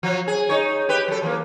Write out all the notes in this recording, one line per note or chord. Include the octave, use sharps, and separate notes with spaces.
F3 F#3
G#4
D#4 C#5
G4 B4
F#3 A4
E3 A#3